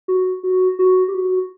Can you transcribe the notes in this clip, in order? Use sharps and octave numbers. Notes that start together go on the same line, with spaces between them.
F#4
F#4
F#4
G4
F#4